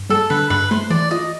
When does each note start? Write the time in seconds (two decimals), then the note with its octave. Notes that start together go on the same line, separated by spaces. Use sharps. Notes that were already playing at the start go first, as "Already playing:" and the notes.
Already playing: G2
0.10 G3 A4
0.30 D3 B4
0.50 G2 B4
0.71 A3 C5
0.90 E3 D5
1.11 F4 D#5